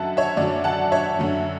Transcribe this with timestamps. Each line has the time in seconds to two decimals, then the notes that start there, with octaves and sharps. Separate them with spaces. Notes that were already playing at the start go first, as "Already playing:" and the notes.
Already playing: F#2 D3 F#3 E5 F#5 A5
0.17 C#5 E5
0.37 F#2 D3 F#3 D5
0.64 F#5 A5
0.92 C#5 E5
1.19 F#2 D3 F#3